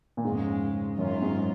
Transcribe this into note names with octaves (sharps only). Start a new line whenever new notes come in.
A#2
F2 G#2 C#3 G#3
F#2 D#3 F#3 C#4 F4
G#2